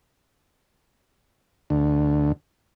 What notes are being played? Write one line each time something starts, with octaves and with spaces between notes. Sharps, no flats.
D2